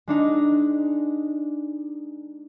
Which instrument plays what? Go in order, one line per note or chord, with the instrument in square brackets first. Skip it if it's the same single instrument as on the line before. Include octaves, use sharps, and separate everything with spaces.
[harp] G#3 D4 D#4